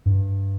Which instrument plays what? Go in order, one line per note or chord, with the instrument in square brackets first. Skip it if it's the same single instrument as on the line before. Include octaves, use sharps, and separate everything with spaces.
[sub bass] G2